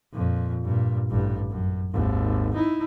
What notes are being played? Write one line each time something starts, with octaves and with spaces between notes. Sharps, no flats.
F2 A#2
G2 A#2
A1 G2
F#2
G#1 D#2
D#4 E4